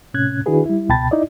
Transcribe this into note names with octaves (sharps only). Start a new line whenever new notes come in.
A2 C3 C#4 F#6 G#6
D#3 D4 E4 F#4 G#4 B4
G3 E4
C#2 B2 G5 A5 B5 A6
D#4 E4 D5 D#5